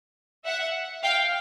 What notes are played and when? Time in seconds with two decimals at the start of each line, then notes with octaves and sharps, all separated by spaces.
0.45 E5 F#5
1.04 F5 G5